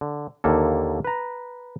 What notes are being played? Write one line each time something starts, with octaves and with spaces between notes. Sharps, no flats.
D3
D#2 D3 A#3 A4
B4 A#5